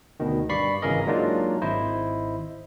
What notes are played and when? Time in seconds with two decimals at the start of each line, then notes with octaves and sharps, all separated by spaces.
0.20 D2 B2 D#3
0.49 G2 D5 B5 C#6 B6 C7
0.82 G#1 C#3 E3 G#4 A#4 D#5
1.07 F#3 G#3 A#3 D4 D#4 F4
1.62 G#1 E4 C5 D#5